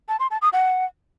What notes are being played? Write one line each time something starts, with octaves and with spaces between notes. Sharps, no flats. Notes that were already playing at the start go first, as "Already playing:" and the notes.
A5
C6
A5
D#6
F#5